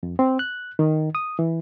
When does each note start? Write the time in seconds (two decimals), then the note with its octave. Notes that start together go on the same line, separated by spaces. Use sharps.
0.03 F2
0.19 C4
0.39 F#6
0.79 D#3
1.15 D#6
1.39 E3